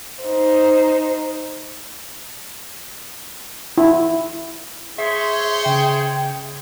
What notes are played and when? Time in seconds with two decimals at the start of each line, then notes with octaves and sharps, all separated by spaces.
0.24 D#4 C5
3.78 E4
4.98 G#4 C5 C#5 E5 C6
5.65 C#3 G5